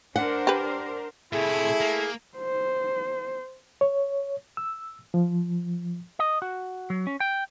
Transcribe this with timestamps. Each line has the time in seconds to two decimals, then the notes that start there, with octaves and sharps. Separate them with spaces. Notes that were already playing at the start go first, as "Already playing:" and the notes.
0.16 D4 A#4 C5 F#5
0.47 G4 B4
1.33 A2 C3 A3 E4 G#4
1.81 A#3
2.38 C5
3.81 C#5
4.57 E6
5.14 F3
6.19 D#5
6.42 F#4
6.90 F#3
7.07 C#4
7.20 G5